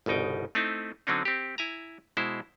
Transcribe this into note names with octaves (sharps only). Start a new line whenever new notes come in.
G1 C2 B2 D#4 G5
A3 C4 D#4 E4
D3 F#3 C4 C#4 D#4
C4 G4
E4 G#5 A#5
B2 G#3 E4 C5